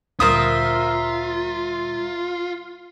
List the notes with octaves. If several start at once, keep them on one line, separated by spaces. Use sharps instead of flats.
D2 A#2 G3 F4 A#4 C5 E5 D#6